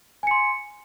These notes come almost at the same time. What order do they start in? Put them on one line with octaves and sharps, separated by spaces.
G#5 C#7 C6